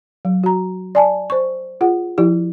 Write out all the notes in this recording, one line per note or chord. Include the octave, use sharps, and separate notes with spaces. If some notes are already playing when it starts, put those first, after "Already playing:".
F#3
F#4 A#5
D5 G#5 A5
C5 C#6
F4 G#4 F#5
F3 E4 G4